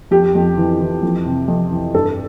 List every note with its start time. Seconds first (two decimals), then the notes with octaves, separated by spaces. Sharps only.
0.11 F2 G4
0.35 F2
0.57 E3
0.81 E3
1.03 F2
1.26 C3
1.48 F2
1.71 E3
1.94 G2 A4